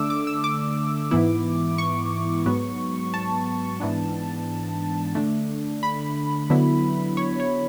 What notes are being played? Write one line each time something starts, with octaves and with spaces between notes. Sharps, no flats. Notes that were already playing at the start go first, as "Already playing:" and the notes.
Already playing: D3 A3 D4 D6 E6
D6
E6
D6
G#2 E3 B3 E4
C#6
G#2 F#3 B3
A5
G#2 E3 B3 D4
D3 A3 D4
B5
D3 F#3 B3 E4
C#5
C#5